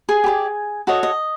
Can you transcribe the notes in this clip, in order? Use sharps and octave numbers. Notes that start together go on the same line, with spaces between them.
G#4 G#5
G4 B4 D5
F#4 A4 C#5 D#5
D#5